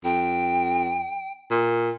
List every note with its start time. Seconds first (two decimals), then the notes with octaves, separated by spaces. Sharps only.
0.04 F2 G5
1.50 A#2